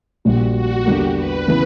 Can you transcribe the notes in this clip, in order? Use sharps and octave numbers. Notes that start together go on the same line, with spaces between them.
A#1 A#2 G3 F#4
F#4
E2 D3 G3 A#3 G4
B4
C#3 E3 B3